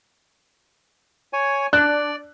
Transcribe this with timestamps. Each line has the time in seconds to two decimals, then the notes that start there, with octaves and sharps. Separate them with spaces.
1.33 C#5 G#5
1.73 D4 D5 F#6